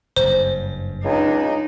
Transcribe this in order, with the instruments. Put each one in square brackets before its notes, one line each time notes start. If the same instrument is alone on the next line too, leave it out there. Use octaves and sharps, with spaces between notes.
[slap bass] F#1 G2 [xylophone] C5
[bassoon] C#2 [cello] D4 D#4